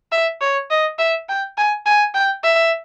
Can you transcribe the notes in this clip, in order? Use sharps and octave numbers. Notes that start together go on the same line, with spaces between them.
E5
C#5
D#5
E5
G5
G#5
G#5
G5
E5